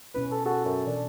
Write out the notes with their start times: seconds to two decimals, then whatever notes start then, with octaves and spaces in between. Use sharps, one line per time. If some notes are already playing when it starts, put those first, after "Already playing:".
0.14 B2 C#4 E4 B4
0.32 A4
0.46 F#4 A4
0.65 F#2
0.87 B2 E3 D4